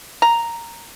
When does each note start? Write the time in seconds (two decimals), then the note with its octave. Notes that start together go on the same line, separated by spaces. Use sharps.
0.22 A#5